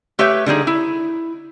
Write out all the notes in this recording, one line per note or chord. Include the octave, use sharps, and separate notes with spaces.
A3 G4 B4 C#5 E5
D3 G3 D#4 G#4
E4